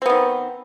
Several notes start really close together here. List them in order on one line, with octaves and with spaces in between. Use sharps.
C4 B3 D#3